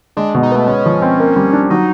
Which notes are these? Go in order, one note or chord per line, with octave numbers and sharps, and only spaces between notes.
G#3 D4
B2
D#4
A3 B3
G#3 C#4
F3
C4
A#3
G3
D4
F#3 D#4